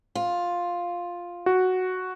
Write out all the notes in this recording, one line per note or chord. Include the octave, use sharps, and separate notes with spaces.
F4
F#4